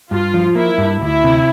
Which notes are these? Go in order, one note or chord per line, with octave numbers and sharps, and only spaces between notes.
G2 F4
F3
A#3 E4
G2
D2 E4
C3